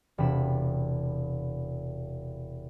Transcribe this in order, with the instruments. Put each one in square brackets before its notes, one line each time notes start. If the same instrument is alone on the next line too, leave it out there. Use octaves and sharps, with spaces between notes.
[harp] E1 C3 B5 E7